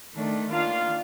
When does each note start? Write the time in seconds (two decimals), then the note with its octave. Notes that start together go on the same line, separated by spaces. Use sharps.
0.13 D#3 A3 D4
0.50 D#3 A#3 D4 F4 F5